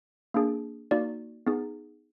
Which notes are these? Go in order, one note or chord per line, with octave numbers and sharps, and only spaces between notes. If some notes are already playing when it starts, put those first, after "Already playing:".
A#3 D4 G#4
A#3 D#4 F#4 D5
B3 D#4 G#4